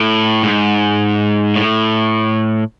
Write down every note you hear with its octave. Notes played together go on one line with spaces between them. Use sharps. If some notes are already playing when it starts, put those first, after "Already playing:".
Already playing: A2
G#2
A2